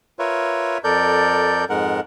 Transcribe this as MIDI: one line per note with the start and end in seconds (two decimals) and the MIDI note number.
0.19 0.78 65
0.19 0.78 70
0.19 0.78 71
0.19 0.78 73
0.19 0.78 76
0.84 1.65 41
0.84 1.65 69
0.84 1.65 70
0.84 1.65 74
0.84 1.65 91
1.69 2.00 41
1.69 2.00 44
1.69 2.00 56
1.69 2.00 70
1.69 2.00 78